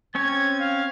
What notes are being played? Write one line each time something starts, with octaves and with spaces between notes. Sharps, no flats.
C4 C#4 C#5 G#6
F5